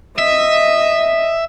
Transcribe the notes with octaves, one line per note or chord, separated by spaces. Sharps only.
D#5 E5